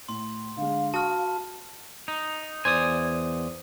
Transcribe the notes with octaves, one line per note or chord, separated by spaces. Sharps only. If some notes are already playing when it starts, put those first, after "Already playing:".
A2 C6
D3 G#3 F5
F#4 A5 D#6 F6
D#4
E2 C5 D5 G#5 D#6